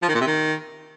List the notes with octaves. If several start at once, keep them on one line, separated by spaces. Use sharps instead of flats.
F3
D#3
A#2
C3
D#3